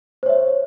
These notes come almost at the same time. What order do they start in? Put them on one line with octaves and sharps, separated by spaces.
C5 C#5 E5